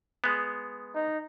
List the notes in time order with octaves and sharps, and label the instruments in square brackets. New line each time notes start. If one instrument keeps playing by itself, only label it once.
[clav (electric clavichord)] G#3 B3
[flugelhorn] D#4